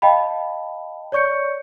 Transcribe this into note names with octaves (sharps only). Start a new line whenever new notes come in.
D#5 F5 G5 A5 B5
C#5 D5 C#6 G6 C#7